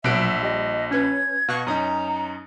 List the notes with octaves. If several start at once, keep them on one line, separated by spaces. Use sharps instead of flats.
A#1 B2 F#3 E5 F#6 D7
G3 D#5
C#4 B4 G#6
B2 F5 C#6 F#6
F#2 C#4 D#4 A#5 D#6